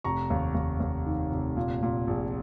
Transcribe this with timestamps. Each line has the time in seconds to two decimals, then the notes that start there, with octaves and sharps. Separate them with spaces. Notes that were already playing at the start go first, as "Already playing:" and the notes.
0.04 F1 A#5 C#6
0.30 D#2
0.55 D#2
0.80 D#2
1.06 D#3
1.32 F1
1.57 A#2
1.83 A#2
2.07 A#1